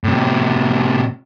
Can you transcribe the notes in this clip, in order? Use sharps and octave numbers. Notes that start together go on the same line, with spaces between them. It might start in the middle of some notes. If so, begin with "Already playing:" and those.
A2 C3